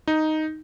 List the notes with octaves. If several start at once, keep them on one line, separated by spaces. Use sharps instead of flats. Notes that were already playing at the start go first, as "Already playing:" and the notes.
D#4